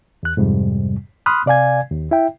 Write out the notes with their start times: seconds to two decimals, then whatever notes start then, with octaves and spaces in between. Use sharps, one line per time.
0.23 E2 F#6
0.37 F2 G#2 C3 G3
1.26 B5 C6 D#6 F6 F#6
1.46 C3 D5 F5 G#5 G#6
1.91 D#2
2.11 E4 E5 G5